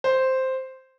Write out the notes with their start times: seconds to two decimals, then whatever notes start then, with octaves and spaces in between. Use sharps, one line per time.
0.04 C5